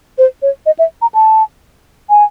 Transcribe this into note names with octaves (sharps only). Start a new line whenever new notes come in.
C5
C#5
D#5
E5
A#5
A5
G#5